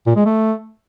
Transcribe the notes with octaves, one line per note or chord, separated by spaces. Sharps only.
A#2
G#3
A3